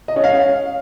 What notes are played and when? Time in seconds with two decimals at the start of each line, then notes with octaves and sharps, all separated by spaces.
0.08 D#5
0.16 C#4
0.24 F5